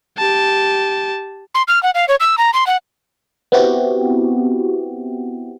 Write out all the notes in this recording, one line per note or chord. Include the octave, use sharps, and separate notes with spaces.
G4 A5
C6
F6
F#5
F5
C#5
E6
A#5
C6
F#5
B3 C4 E4 F#4 G4